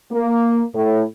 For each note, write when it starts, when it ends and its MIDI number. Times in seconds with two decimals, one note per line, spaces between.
0.11 0.62 58
0.74 1.03 45